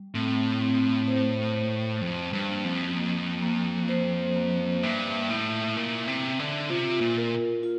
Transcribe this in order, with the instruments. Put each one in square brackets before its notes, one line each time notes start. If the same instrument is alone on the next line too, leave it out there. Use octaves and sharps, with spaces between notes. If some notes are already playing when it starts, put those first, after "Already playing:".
Already playing: [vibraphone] G3
[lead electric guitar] A2 [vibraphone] C4
[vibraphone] C4
C5
C5
[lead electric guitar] F2 [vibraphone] C5
[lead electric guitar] G2
[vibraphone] A#3
[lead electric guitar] F2
[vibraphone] A#3
A#3
C5
A#3
[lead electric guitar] G2 [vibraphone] E5
[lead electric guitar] A2 [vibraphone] E4
[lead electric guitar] A#2 [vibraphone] E5
[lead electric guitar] C3
[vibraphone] E5
[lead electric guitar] D3
[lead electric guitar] C3 [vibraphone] F4
[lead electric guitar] A#2
[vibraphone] A#4
F4